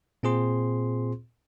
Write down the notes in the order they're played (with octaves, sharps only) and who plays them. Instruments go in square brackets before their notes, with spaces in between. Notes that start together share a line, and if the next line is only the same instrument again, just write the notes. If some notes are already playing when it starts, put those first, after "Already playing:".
[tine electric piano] A#2 C4 F4 G#4 C5 C6